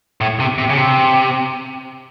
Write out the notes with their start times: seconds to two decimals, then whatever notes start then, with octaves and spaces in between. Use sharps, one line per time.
0.21 A2
0.40 C3
0.58 C3
0.69 C#3
0.77 C3